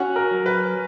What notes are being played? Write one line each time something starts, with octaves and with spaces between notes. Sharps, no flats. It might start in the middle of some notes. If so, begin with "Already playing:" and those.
Already playing: C#4 F#4
A#4
F#3
B4